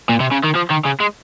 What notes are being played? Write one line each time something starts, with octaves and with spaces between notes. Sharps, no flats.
A#2
C3
C#3
D#3
F3
D#3
C#3
G#3